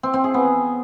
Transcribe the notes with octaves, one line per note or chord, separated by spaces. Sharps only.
C4
C4
G#4
B3